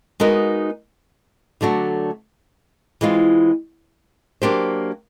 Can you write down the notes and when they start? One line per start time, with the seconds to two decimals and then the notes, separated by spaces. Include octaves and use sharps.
0.20 G#3 B3 D#4 F#4 A#4
1.61 D3 F#3 A3 D4 F#4
3.01 E3 G#3 C4 F4
4.42 F#3 A#3 D4 G4 C5